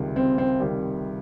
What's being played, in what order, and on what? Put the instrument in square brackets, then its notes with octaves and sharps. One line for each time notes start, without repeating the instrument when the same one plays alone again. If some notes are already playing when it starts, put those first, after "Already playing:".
Already playing: [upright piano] C#2 C3 D#3 G3
[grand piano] C4
C4
[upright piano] C3 D#3 G3